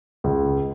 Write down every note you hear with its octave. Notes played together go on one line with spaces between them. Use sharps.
C#2